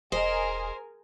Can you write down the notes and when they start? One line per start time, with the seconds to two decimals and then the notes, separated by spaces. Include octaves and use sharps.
0.12 E1 G#4 A#4 C5 D#5 G#5